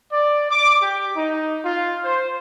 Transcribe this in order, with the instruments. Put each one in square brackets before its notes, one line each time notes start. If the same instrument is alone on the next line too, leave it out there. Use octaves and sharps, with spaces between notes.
[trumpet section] D5
D6
G4
D#4
F4
C5